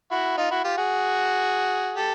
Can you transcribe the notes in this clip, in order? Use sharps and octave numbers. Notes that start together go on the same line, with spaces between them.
E4 F#4
D#4 F4
E4 F#4
F4 G4
F#4 G#4
G4 A4